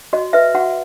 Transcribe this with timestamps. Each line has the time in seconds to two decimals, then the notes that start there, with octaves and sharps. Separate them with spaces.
0.13 F#4 D#5
0.33 B4 E5
0.55 F#4 F#5